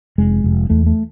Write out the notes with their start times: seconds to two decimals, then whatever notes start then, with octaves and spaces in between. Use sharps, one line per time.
0.18 F1 G#3
0.44 F1
0.70 E2 A3
0.86 A3